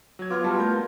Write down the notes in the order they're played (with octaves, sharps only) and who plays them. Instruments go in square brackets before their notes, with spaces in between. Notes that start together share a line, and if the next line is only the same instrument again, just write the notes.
[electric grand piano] F#3 G#6
[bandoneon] B3 F4 [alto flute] B4 [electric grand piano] D6 F6 G#6
[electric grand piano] G3 E4 F#4 [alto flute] A5
[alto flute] A3 [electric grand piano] A#4 G6